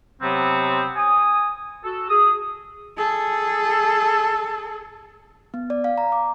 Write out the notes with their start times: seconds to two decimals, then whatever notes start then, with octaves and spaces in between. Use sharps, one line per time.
0.20 C3 F#3 B3 C4
0.95 G#5 D#6
1.83 F#4 A4
2.08 G#4 D#6
2.97 G#4 A4
5.54 B3
5.70 D5
5.84 F5
5.98 A#5
6.12 D6